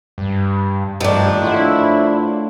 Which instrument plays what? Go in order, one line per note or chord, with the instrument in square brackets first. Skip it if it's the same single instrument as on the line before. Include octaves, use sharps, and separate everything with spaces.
[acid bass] G2
[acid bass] G2 [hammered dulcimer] D#3 A3 [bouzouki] F3 D4
[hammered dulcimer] D3 C5 C#5 [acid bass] E4